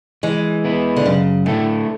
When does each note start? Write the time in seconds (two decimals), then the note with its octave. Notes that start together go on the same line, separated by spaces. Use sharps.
0.23 E3 G#3
0.64 B3 E4 B4
0.96 D3
1.06 F#2 C#3
1.46 A2 D3 A3 E4 A4